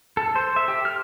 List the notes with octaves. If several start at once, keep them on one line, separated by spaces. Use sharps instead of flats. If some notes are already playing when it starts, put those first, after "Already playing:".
A4
C5
E5
G4
F6